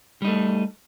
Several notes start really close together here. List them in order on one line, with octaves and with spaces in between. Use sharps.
G3 D#4 A3